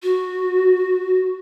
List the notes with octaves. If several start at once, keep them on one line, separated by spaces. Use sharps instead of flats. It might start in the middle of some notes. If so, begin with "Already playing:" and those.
F#4